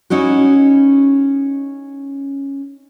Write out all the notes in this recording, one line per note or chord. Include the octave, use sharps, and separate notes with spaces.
C#4 D#4 E4 F#4